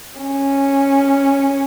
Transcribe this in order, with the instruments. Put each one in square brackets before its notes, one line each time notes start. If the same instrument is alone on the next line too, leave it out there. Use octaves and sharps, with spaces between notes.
[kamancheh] C#4